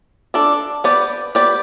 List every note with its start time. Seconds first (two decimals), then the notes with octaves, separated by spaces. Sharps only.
0.34 D4 A4 D5
0.84 B3 G4 B4 D5
1.35 B3 G4 B4 D5